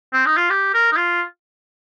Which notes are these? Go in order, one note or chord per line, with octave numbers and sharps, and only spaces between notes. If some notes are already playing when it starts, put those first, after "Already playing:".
C4
D#4
F4
G4
A#4
D#4
F4